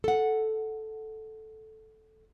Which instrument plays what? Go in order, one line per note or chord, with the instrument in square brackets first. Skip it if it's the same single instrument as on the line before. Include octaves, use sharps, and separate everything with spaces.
[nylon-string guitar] A4 F#5